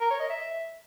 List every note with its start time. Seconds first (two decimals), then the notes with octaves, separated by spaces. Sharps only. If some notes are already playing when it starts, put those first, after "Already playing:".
0.01 A#4
0.10 C#5
0.20 D#5
0.30 E5